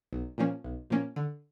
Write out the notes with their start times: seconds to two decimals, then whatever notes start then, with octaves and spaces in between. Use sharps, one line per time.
0.13 B1
0.38 A#2 F3 A#3 C#4
0.64 B1
0.90 A#2 F3 A#3 C#4
1.16 D3